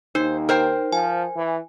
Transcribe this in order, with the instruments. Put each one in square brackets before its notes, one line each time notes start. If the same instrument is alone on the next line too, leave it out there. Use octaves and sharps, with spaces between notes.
[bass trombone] D#2 [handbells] D#4 [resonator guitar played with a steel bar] C5
[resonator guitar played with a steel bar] A#4 C5 G5
[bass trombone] F3 [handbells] G#5
[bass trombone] E3